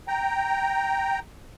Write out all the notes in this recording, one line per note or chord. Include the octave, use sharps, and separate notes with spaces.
G5 A#5